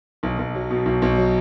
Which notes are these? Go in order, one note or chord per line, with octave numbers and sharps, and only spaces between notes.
B1
B1
F#3
B2
B1
B1
F#3